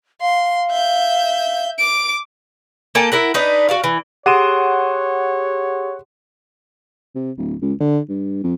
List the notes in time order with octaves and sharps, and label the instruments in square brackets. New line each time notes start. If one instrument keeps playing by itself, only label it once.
[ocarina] F5 [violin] C6
[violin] E5 G6
D6 D7
[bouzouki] A#3 A4 G5 G#5
E4 A#4 F#5
D4 D#4 B4
F#4 D5 F5
E3
[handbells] G4 G#4 C6 [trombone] C#5 [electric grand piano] F#5 D#7 E7
[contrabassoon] C3
D1
C#2
D3
G2
F2